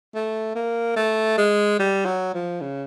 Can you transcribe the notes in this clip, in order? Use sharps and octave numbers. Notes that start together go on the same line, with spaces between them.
A3
A#3
A3
G#3
G3
F#3
F3
C#3